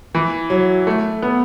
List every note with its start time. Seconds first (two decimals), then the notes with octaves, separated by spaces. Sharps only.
0.15 E3
0.50 F#3
0.87 A3
1.22 B3